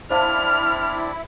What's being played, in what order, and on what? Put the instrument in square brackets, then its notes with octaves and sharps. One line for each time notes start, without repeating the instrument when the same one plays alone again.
[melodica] C4 D4 D5 [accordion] E4 [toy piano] C5 F5 A5 [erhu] F6